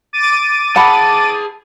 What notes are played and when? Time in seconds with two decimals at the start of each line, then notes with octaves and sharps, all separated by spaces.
0.13 D6 A6 D#7
0.76 G#4 F#5 A5 B5